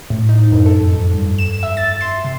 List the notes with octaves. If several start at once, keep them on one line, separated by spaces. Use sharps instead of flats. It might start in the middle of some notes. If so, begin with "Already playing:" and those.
A2
D#4
F#2
A4
F2
G2
E7
E5
A6
C6
C3